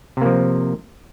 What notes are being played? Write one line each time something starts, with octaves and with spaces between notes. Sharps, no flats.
C3 F3 A#3